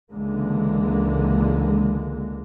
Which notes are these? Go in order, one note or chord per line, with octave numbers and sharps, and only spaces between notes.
C#2 D3 E3 G#3 A#3